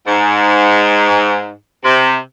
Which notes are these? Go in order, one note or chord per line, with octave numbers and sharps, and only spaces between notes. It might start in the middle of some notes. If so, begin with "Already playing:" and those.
G#2
C3